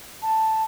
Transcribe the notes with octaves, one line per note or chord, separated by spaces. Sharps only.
A5